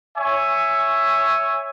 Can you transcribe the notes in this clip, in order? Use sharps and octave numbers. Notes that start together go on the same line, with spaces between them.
C#5 E5 G#5 C#6